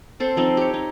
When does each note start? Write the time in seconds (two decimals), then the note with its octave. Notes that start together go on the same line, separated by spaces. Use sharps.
0.20 C4 A4 C5
0.36 F3 C4 D#4
0.57 G4 C#5
0.74 D#4